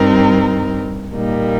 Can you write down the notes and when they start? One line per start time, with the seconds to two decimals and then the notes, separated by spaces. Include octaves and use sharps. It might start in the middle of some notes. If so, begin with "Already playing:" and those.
Already playing: G2 G3 C4 D#4 A#4
1.15 A#2 G3 A#3 D#4